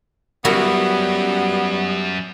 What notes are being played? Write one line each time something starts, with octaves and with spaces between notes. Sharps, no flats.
F#2 G3 B3 E4 F#4 A#4